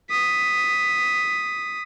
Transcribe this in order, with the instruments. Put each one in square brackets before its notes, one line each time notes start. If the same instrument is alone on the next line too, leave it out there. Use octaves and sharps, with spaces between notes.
[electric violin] D#6 B6